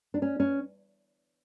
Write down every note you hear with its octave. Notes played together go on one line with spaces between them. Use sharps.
D4
C#4
C#4